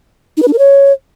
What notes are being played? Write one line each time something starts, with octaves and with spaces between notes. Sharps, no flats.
D#4
B4
D4
A#4
C#5